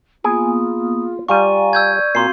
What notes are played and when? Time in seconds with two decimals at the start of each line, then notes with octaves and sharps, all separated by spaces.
0.24 A#3 B3 F4 G#4 G#5 D#6
1.28 G3 F4 D5 F5 G#5 A#5 C#6 D#7
1.73 E6 G6 G#6
2.15 A#2 C4 F#4 F5 C6 C7